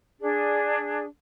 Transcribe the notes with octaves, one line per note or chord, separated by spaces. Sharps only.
D4 G#4